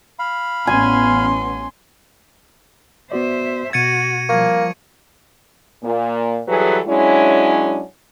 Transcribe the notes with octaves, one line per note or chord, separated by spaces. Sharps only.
F5 B5
A1 B3 C#4 G#5 C6
B3 F#4 C5 D5 E5
B2 F#4 G#6 A6 C#7 D#7
F3 G3 A#3 C#6 G#6
A#2 A#3
E3 F#3 G3 G#4 A4 B4
F#3 G#3 C#4 D4 E4